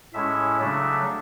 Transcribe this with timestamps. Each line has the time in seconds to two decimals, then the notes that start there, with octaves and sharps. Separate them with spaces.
0.13 A2 G#3 C#4 E4 E5
0.59 C#3 F#3 A3 D4